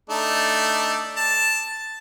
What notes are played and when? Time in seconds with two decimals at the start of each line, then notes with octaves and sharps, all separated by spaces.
0.10 A3 D4 D#4
1.17 A5